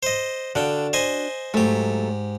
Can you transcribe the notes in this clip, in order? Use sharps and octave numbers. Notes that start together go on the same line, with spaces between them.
C5 D#5
D3 D4 F#4 F5 G5
C5 D#5 G#5
G#2 F#3 A3 G4